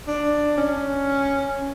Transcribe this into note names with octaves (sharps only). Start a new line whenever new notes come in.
D4
C#4
C#4